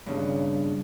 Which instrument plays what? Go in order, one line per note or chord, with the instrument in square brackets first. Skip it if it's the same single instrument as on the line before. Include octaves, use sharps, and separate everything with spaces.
[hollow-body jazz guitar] G2 C#3